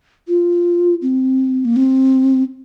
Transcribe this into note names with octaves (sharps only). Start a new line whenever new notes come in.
F4
C4
A#3
C4